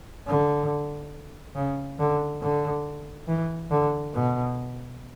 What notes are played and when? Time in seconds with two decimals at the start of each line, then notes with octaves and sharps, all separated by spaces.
0.27 D3
1.55 C#3
1.99 D3
2.42 D3
3.28 E3
3.71 D3
4.14 B2